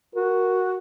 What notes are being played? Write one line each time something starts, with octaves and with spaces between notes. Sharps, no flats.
F#4 A#4